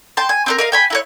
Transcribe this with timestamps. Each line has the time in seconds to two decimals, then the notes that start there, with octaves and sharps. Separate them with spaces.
0.17 G5 A5 C6
0.29 G#5
0.46 C4 D4 A#4
0.58 A#4 D#5 F5
0.72 G5 G#5 B5
0.90 E4 A#4 C#5